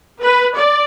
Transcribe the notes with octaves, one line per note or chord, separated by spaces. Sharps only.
B4
D5